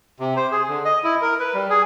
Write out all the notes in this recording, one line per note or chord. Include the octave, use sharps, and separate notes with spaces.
C3
C5
G#4
D3
D#5
E4
A#4
B4
G3
G#4